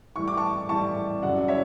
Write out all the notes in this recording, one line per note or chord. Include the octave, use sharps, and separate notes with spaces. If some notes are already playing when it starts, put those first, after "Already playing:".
A2 E3 G3 C#6
D6
A5 C#6
A2 E3 G3 A5 C#6
F#2 C#3 F#3 D5 F#5
C#5 E5